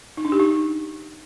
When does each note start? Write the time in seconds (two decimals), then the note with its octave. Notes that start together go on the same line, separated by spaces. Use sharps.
0.17 D#4
0.25 D4
0.32 G4
0.39 D#4